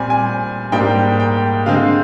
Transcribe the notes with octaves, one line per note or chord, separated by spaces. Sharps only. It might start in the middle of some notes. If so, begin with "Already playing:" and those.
Already playing: A#2 G3 C4 G#5
G#5
G#2 G3 A#3 G5
G5
D3 G#3 C4 F5